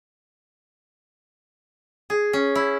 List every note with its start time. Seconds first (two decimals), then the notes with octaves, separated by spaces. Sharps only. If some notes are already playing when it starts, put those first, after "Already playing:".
2.10 G#4
2.33 C#4
2.55 E4